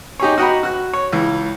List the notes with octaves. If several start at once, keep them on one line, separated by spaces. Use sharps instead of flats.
D#4 G4 G#4 C#5
F#4 D#5 F#5 G5 A#5 B5
F#4 F#6
C#5
C#2 E3